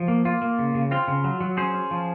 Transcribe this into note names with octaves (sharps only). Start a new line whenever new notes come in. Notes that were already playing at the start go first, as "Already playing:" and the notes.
Already playing: F3
A#3
A#3 F4
A#3
C#3
C#3
C4 F4
C#3
F#3
F#3
C#4 G#4 C5
C#4
F3